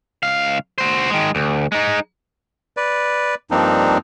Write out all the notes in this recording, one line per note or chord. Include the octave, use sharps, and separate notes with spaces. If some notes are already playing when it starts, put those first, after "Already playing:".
C#2 F5
F#4 C5
D#3 G#3
D2
G#3 D#4
B4 D5
G2 F3 A#3 C4 D4 D#4